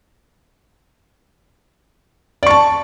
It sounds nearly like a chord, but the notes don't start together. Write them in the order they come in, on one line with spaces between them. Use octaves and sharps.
D5 C#6 A5